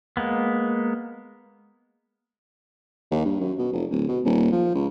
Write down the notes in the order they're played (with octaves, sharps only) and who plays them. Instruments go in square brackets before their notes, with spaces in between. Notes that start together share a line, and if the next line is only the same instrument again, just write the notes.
[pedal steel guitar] G#3 A#3 B3
[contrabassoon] D#2
G2
F#2
B2
F1
D1
B2
D#1
F3
C#2